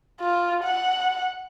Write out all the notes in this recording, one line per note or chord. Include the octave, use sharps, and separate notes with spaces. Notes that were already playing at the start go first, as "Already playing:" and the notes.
F4
F#5